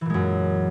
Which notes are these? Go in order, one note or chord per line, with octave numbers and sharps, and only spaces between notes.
F#2 A#2 E3 G#3